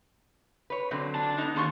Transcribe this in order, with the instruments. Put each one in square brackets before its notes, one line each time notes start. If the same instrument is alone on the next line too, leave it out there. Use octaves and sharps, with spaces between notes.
[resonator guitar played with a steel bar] B4 C#5
D3 F#3 C4
[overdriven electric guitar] D4 A5
[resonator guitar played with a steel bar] B3 D#4
[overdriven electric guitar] D#2 [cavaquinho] A4 C6 C#6